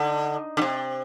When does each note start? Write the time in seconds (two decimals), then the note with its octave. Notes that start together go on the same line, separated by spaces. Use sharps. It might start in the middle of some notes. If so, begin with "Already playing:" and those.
Already playing: D3 D#4
0.57 D3
0.62 C3